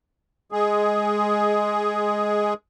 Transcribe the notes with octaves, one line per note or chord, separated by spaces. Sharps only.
G#3 G#4